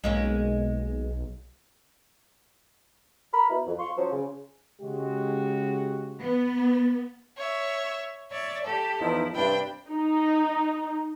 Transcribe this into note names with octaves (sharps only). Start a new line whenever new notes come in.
B1 G#3 A#3 C#4
A#4 B5
B2 E4
F2
F5 C6 C#6
F3 F#3 C#4 C5
C#3
C#3 G#3 F#4 G4
B3
C#5 E5
C#5 D5 E5
G4 A4
E2 F3 D#4 E4
G2 C3 D4 G5 B5
D#4